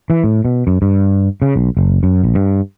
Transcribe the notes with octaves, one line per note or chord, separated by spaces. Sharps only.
E3
A2
B2
F#2
G2
C#3
B1
F#1
F#2
A#1
G2